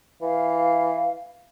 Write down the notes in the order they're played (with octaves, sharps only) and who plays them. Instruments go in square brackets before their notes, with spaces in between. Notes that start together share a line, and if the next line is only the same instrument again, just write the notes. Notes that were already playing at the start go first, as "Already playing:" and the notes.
[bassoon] E3 [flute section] F5